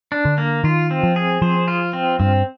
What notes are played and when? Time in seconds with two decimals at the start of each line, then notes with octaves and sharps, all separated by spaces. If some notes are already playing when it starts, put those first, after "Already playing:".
0.12 D4
0.25 D3
0.38 A#3
0.64 D#3 F4
0.91 C4
1.03 F3
1.16 G#4
1.42 F3 C5
1.68 F4
1.93 C4
2.20 G2 C4